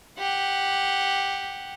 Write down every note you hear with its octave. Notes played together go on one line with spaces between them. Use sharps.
G4 F#5